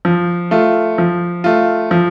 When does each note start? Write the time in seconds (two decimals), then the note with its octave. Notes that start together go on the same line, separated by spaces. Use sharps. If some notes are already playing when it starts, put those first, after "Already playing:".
0.05 F3
0.51 A3 F4
0.98 F3
1.44 A3 F4
1.91 F3